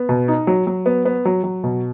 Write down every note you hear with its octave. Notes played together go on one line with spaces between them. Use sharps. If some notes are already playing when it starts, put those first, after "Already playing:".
Already playing: B3
B2
D#4
F#3
F#3
B3
B3
F#3
F#3
B2